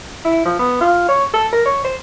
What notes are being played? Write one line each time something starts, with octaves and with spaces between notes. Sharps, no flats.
E4
F3
B3
F4
C#5
A4
A#4
C#5
C5